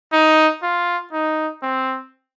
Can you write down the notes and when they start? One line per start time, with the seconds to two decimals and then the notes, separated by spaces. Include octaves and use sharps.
0.12 D#4
0.63 F4
1.12 D#4
1.62 C4